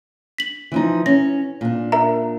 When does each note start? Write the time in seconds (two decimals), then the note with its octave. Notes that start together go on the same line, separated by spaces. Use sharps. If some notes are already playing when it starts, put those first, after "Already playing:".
0.38 B6 F#7
0.72 E3 F3 D#4
1.06 C#4 A#6
1.61 A#2 D4
1.92 A#4 E5 A#5